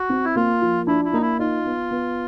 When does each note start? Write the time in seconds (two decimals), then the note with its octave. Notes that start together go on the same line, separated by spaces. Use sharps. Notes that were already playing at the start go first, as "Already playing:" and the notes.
Already playing: F#4
0.09 C4
0.25 E4
0.36 A#3 F4
0.62 F3
0.87 D4 E4
1.05 E4
1.13 A#3 D#4
1.22 E4
1.39 D#4 F4
1.65 B3
1.91 B3